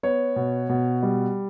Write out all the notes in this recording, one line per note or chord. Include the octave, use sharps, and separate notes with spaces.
B3 C#5
B2
B2
G3